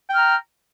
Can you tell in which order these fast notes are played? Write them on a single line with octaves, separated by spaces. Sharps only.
G5 F6 A#5